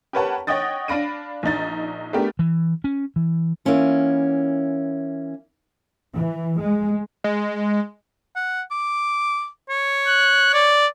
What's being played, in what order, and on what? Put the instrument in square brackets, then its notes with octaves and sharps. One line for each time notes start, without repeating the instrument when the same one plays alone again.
[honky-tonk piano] G4 A#4 B4 C#5 F#5 A5
C#5 D#5 F#5 G5 D#6 A6
D4 F5 B5 A#6 D7 D#7
A#1 D4 D#4 A6
A3 B3 D4 G4 A#4
[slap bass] E3
C#4
E3
[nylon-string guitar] E3 G3 A#3 B3 C#4 F4
[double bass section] E3
G#3
[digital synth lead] G#3
[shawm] F#5
D6
C#5
[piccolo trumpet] F#6
D5